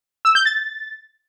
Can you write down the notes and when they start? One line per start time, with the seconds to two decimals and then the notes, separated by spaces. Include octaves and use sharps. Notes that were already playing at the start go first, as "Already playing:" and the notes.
0.25 E6
0.35 G6
0.45 A6